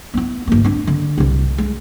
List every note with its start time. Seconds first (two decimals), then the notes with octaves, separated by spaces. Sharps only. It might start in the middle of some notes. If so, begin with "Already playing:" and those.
0.14 B3 E4
0.47 G1 A#3
0.64 C4 D4
0.87 D3
1.18 C2 G2
1.58 G#3